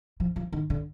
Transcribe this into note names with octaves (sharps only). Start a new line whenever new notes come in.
F3
F3
D#3
D3